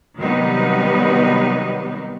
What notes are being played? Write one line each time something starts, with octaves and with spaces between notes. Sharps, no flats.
C3 D#3 F#3 G3 B3 D#4